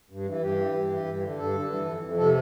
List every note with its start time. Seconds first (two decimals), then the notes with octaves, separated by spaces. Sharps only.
0.10 G2
0.26 E3
0.41 G2 G4
0.58 E3
0.74 G2
0.89 E3
1.06 G2
1.21 D3
1.38 G2 A4
1.54 D3
1.70 E3
1.85 F2
2.01 F2
2.17 C3 A4